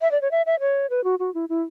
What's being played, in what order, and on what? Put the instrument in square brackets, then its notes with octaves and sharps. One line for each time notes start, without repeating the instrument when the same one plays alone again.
[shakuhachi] E5
D5
C#5
E5
E5
C#5
B4
F#4
F#4
E4
E4